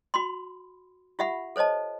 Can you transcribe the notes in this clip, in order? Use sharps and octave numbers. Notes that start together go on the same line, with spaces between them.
F#4 B5 C6
F4 G4 E5 F#5 B5
A4 C5 C#5 D#5 A5